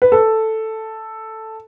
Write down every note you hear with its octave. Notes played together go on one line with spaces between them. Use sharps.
B4
A4